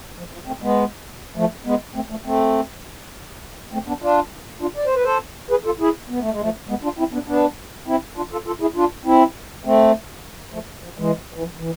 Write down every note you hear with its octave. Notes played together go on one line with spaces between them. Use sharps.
F3
F3
A3 C4
G#3 B3
F3 A3
G#3 B3
A3 C4
F3 A3
A3 C4
A3 C4
B3 D4
D4 F4
D4 F4
D5
C5
B4
A4 C5
G#4 B4
F4 A4
E4 G#4
B3
A3
G#3
F3 A3
G#3 B3
D4 F4
C4 E4
B3 D4
B3 D4
C4 E4
D4 F4
F4 A4
F4 A4
E4 G#4
D4 F4
C4 E4
A3 C4
F3 A3
F3
E3 G#3
E3
F3
E3